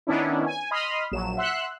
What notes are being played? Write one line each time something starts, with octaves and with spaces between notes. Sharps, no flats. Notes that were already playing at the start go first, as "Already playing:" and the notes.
D#3 B3 C#4 D4 E4
G#5
D#5 B5 C6 D#6 F6
A#1 F#3 E7
E5 F#5 C6 E6 F#6